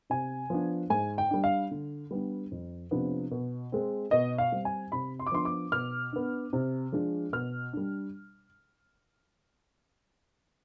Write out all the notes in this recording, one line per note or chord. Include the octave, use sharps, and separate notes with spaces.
C3 G#5
F3 B3 D4
G#2 G#5
G5
G3 D4
F5
D3
G3 B3 D4
F2
C3 F3 B3 D4
B2
G#3 C4
B2 D#5
F5
G3 C4
G#5
C3 B5
C6
D6
F3 B3 D4 C6
D6
B2 F6
B3 D4
C3
F3 G#3 D4
B2 F6
G3 D4